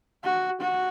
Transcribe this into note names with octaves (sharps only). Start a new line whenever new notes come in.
F#4
F#4